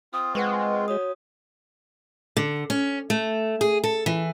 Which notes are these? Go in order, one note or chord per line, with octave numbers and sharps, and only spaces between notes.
C4 F4 D#6
G#3 B4 F#5 C#6
F#4 C#5 D#6
D3
C#4
A3
G#4
A4
E3